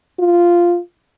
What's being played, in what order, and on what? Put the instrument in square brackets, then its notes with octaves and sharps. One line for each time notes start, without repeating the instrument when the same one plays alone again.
[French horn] F4